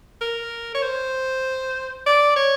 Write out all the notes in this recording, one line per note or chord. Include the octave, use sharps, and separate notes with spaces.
A#4
C#5
C5
D5
C#5